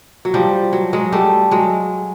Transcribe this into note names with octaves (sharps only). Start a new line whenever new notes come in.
F#3
F3 G3
F#3
F#3 G#3
G3 A3
F#3 G#3